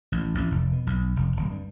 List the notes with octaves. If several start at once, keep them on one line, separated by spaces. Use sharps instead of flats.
A1
A1
F1
B2
B1
F1
D1
G2